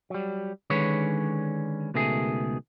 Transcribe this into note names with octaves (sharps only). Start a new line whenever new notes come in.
F#3 G3
D3 D#3 G#3 C#4 B4 C#5
C#2 B2 D#3 A3 G#4